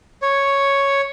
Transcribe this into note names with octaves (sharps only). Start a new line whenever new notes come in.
C#5